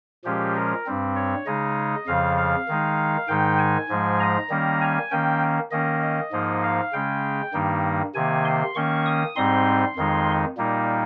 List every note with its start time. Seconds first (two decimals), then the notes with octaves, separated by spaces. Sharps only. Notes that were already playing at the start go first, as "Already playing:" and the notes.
0.25 A#2 F3 G#3 C#4 G4
0.56 A#4
0.86 G2 G3 C4
1.16 C#5
1.46 C#3 G#3 D#4 D#5
2.07 F2 C#3 F3 F5
2.37 F5
2.68 D#3 G#3 D#4
3.28 G#2 D#3 G#3 D#4 G5
3.59 G#5
3.89 G#2 F3 G#3
4.20 A#5
4.50 D#3 G3 A#3 C#4
4.81 G#5
5.11 D#3 A#3 C#4 G5
5.71 D#3 A#3 C#4 D#5
6.02 D#5
6.32 G#2 F3 A#3 D#4
6.63 F5
6.93 C#3 G#3 C#4 G5
7.53 G2 D#3 G3 A#3 D#4
8.15 C3 D#3 A#3 G#5
8.45 C6
8.75 D#3 A#3 C#4 C#6
9.06 D#6
9.36 G#2 G3 C4 D#4 C6
9.96 F2 D#3 G#3 D#4
10.57 A#2 G3 A#3 D#4